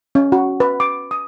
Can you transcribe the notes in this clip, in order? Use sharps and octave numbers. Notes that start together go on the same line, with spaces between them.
C#4
F#4
B4
D6
D#6